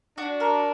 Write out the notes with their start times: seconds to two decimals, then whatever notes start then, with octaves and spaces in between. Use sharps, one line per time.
0.18 D4 F#4
0.40 A#4